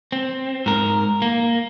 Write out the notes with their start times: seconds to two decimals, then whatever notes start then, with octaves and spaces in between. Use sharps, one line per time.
0.12 C4
0.66 G#2 A#4
1.22 A#3